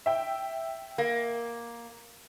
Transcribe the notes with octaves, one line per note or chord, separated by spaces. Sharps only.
E5 G5
A#3